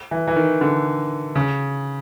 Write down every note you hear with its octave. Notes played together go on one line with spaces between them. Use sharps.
E3
E3
D#3
D3
C#3